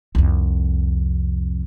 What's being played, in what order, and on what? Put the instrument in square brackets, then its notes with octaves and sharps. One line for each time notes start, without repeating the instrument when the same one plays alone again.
[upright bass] C2 F2